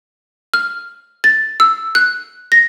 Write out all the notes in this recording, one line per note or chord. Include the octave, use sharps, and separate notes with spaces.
F6
A6
E6
F#6
A#6